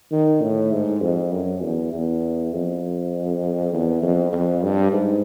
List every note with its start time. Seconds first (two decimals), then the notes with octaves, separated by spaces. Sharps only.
0.12 D#3
0.42 A2
0.72 G#2
1.02 F2
1.32 F#2
1.62 E2
1.92 E2
2.53 F2
3.73 E2
4.02 F2
4.33 F2
4.63 G2
4.93 G#2